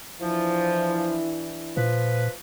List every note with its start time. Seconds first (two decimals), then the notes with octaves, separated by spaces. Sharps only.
0.21 E3 F3 D4 E4
1.77 A#2 F3 B4